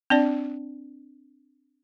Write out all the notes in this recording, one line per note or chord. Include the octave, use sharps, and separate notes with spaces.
C4 D4 D5